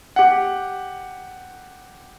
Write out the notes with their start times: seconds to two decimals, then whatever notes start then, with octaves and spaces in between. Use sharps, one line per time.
0.16 G4 F#5